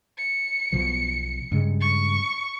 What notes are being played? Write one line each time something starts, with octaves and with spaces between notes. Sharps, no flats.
C#7
B1 B2 F3
G2 C#3 G#3
C#6